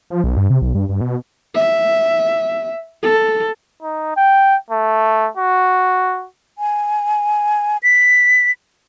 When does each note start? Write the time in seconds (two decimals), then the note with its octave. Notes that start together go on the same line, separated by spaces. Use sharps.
0.10 F3
0.24 B1
0.37 G2
0.50 C3
0.62 B1
0.75 G2
0.89 G2
1.01 B2
1.55 E5
3.03 A4
3.82 D#4
4.17 G5
4.70 A3
5.37 F#4
6.58 G#5
7.83 B6